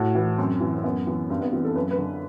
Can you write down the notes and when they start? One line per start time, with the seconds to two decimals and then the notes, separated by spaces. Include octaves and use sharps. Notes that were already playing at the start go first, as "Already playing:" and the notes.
Already playing: A2 F#4
0.15 E3
0.38 F#2 C4
0.61 E3
0.77 C4
0.84 F#2 B3
1.07 E3
1.30 G2 C4
1.41 B3
1.52 E3 C4
1.64 A4
1.76 F#2 B4
1.91 B4
1.98 D3